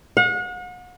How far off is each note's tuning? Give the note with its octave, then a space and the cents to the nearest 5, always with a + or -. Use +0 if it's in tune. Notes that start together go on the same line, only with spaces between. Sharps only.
F#5 -40